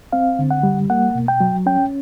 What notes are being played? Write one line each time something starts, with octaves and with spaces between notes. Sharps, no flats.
C4 F5
D3
F#5
G3
A#3 F#5
B2
G5
F#3
C#4 G5